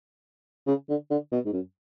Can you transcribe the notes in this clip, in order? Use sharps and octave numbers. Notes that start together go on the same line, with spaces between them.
C#3
D3
D3
B2
G#2
F#2